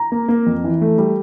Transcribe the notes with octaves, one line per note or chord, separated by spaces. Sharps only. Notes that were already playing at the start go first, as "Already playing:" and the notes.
Already playing: A#5
A#3
A#3
F2
E3
A3
G3